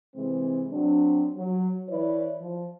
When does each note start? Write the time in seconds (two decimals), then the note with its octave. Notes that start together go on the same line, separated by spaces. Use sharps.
0.15 C3 E3 G#3 C4
0.71 F#3 C4 D4
1.36 F#3
1.89 E3 E4 B4 C#5 D5
2.41 F3